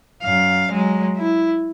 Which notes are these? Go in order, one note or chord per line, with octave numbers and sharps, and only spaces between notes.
F#2 F5
F#3 G#3
E4